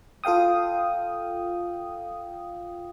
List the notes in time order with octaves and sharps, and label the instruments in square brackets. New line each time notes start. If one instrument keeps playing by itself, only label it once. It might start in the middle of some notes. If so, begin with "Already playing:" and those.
[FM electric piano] F4 A4 F5 G5 D#6